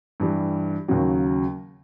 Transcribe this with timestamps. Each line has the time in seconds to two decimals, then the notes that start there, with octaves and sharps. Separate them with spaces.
0.20 G2 E3 G3
0.88 D#2 C#3 F#3